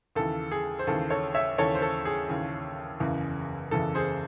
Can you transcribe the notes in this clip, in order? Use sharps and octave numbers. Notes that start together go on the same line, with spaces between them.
D#2 C#3 E3 A4
G#4
C5
D#2 C#3 E3 A4
A4 C#5
C#5 E5
D#2 C#3 E3 A4 C#5
C5
A4
G#4
D#2 C#3 E3
F#1 E2 C#3 E3
F#1 E2 C#3 E3 A4
G#4 C5